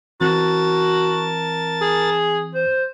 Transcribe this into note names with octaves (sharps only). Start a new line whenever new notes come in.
E3 C4 F#4 A#4 A5 A6
G#4
C5